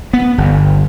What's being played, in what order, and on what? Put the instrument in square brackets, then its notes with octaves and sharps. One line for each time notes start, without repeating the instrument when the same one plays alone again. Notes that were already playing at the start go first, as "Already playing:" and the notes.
[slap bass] B3
G1